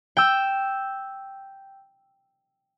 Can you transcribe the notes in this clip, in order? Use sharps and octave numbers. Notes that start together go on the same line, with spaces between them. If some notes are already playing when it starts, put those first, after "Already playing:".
G5 E6